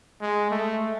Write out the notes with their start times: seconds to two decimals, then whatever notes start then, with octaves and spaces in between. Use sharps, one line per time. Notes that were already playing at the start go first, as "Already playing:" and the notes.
0.21 G#3
0.51 A3